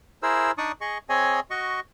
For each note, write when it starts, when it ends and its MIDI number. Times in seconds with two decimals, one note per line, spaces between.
0.23 0.51 64
0.23 0.51 68
0.23 0.51 70
0.23 0.51 72
0.23 0.51 88
0.58 0.72 62
0.58 0.72 63
0.58 0.72 74
0.58 0.72 85
0.58 0.72 87
0.81 0.98 68
0.81 0.98 75
0.81 0.98 85
1.09 1.40 60
1.09 1.40 68
1.09 1.40 73
1.09 1.40 75
1.09 1.40 80
1.50 1.80 66
1.50 1.80 75
1.50 1.80 85